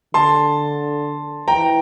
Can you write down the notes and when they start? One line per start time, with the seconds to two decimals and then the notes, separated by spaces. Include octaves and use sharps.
0.14 D3 A5 C6
1.47 E3 G5 A#5